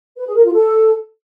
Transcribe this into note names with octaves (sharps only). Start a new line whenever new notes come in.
B4
G#4
A#4
F4
A4